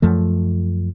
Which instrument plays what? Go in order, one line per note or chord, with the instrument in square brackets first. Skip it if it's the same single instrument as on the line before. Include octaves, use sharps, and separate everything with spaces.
[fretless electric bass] F#2 F3 A3